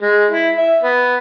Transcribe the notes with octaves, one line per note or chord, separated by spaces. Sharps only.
G#3
E4
E5
B3